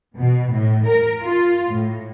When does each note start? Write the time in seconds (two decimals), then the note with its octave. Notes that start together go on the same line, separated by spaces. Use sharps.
0.18 B2
0.53 A2
0.87 A#4
1.22 F4
1.71 A2